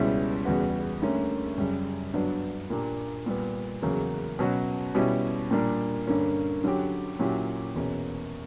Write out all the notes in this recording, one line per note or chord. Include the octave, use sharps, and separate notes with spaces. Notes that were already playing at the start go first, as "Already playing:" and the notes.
Already playing: C#2 B2 G3 C#4 E4
E2 C#3 G3 B3 F#4
D2 D3 G3 A#3 C#4
F#2 C#3 G3
G2 F#3 B3 D4
A#2 A#3 D4 G4
A#2 G3 B3
E2 C#3 F#3 A#3
B2 F#3 C#4 F#4
B2 G3 C#4 E4 G4
A#2 G3 A#3 D4
G2 D3 A#3 C#4
D3 F#3 C#4 G4
A#2 F#3 C#4 E4 G4
E2 B2 A#3 C#4